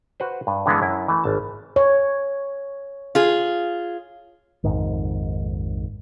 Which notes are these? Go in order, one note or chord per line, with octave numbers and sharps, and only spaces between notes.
F#4 B4 C5
G2
G2 D3 E3 G#3 B3
F#2 E4
E3 A3
G#1 A5
C#5
F4 G#4
A#1 F2 G#2 D#3